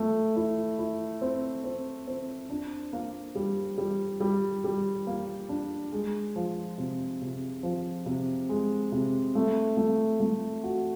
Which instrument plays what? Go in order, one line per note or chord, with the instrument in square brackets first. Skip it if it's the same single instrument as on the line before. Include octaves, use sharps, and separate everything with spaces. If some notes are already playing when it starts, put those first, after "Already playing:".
Already playing: [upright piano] A3
E4
E4
C4
C4
C4
D4
A#3
G3
G3
G3
G3
A#3
D4
G#3
F3
C3
C3
F3
C3
G#3
C3
A3
A3
A3
F#4